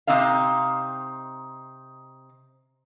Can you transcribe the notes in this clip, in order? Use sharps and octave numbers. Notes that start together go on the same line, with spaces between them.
C3 G3 C4 D#4 D#5 F5